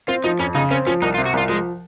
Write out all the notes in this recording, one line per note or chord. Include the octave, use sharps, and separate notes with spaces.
C4 F4
F3 D#4
F2 C#4
C#3 D#4
C4 C#4
F3 C#4
C2 D#4
F4
C3
F#4
C2 F4
F3 G#3